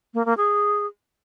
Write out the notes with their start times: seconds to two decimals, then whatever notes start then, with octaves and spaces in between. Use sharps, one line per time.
0.14 A#3
0.26 A#3
0.37 G#4